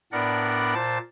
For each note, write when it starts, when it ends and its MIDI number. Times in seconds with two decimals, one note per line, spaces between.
0.12 0.74 45
0.12 0.74 59
0.12 0.74 62
0.12 0.74 70
0.12 0.74 74
0.12 0.74 78
0.74 0.98 46
0.74 0.98 72
0.74 0.98 81
0.74 0.98 93